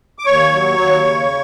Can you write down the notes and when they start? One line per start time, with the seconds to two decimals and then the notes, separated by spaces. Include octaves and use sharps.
0.19 D6
0.26 D#2 C#5 C#6
0.52 F#3
0.79 D#2
1.04 C#3